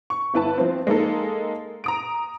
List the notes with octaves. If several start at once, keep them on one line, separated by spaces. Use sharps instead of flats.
C#6
G1 E4 B4 A5
F3 C4
G#3 A#3 D#4 A4
A#5 D#6 D7